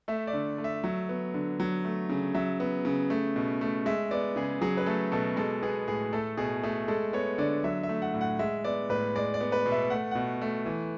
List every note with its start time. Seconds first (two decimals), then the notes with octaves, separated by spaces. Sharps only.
0.08 A3 E5
0.27 D5
0.33 D3
0.58 A3
0.64 E5
0.84 F#3
1.09 B3
1.34 D3
1.60 F#3
1.85 A3
2.09 C#3
2.35 F#3 E5
2.60 B3
2.85 C#3
3.10 A3
3.36 B2
3.61 A3
3.86 G#3 E5
4.11 B3 D5
4.36 C#3 G#4
4.61 F#3 G#4
4.77 B4
4.86 A3 A4
5.12 B2 A4
5.37 G#3 A4
5.63 B3 G#4
5.88 A2 G#4
6.13 A3 A4
6.37 B2 G#4
6.63 A3 G#4
6.88 G#3 A4
7.13 B3 C#5
7.38 D3 D5
7.64 F#3 E5
7.83 E5
7.89 A3
8.02 F#5
8.14 A2
8.21 F#5
8.39 G#3 E5
8.64 B3 D5
8.89 A2 B4
9.15 G#3 D5
9.34 D5
9.40 B3
9.52 B4
9.66 B2
9.72 E5
9.90 A3 F#5
10.11 B2 F#5
10.41 A3
10.66 E3